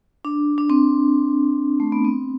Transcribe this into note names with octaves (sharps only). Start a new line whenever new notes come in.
D4
D4
C4
A3
B3
C4